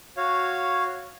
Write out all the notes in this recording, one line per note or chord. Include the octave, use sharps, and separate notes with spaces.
F#4 C#5 F5